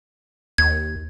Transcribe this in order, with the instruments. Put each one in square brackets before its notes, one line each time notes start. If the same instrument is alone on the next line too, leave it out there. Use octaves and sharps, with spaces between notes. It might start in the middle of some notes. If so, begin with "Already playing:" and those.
[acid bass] D#2 [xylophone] G#6